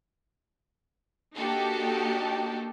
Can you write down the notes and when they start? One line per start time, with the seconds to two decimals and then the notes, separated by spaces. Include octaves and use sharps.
1.35 A#3 D4 D#4 F#4 G4 A4